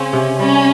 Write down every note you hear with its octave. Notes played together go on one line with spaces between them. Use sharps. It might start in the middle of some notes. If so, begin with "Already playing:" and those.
Already playing: C#3 C4 C#4
C3
G3 C#4